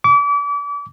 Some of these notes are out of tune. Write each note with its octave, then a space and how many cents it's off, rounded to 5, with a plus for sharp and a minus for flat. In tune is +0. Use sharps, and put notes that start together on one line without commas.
D6 -35